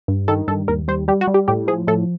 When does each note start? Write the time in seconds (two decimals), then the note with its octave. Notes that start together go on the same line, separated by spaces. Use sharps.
0.08 G2
0.28 D#3 A4
0.48 G2 A4
0.68 D#2 A#4
0.88 G3 C5
1.08 G3 G4
1.21 F#4
1.27 G3
1.34 G4
1.48 A2 G4
1.68 F3 G#4
1.87 A2 A4